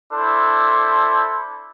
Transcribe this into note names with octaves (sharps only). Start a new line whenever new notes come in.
D4 E4 A4 C5